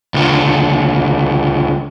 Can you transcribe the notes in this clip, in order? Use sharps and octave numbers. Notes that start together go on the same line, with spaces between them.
C#2 D3